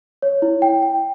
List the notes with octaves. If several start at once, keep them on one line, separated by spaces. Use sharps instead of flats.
C#5
E4
G5
G5